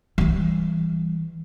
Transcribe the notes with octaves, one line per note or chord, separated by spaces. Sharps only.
E3 G3